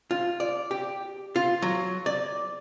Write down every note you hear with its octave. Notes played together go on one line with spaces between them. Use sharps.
F4
D5
G4
F4
F#3
D5